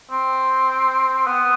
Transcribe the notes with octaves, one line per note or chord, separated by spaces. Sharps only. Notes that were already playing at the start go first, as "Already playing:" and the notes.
C4
B3